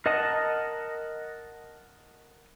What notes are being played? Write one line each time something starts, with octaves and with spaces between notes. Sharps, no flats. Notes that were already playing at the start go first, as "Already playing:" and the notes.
A#4 D#5 F#5 A5 D#6